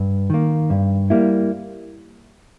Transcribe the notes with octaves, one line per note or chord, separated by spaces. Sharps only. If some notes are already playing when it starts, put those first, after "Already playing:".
Already playing: G2
D#3 A#3
G2
G3 A#3 E4